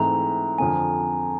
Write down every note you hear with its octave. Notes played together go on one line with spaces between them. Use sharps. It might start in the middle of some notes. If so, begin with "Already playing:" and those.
Already playing: G#2 E3 A3 C4 A#5
F2 D3 F3 G#5